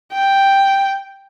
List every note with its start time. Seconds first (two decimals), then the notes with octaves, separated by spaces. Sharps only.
0.13 G5